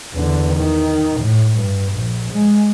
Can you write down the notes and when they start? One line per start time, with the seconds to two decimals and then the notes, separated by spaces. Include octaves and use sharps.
0.13 E2 D3
0.55 D#3
1.21 A2
1.57 G2
1.94 A#1
2.32 G#3